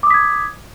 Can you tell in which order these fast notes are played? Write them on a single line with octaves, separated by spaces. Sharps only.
D6 D#6 B6 G#6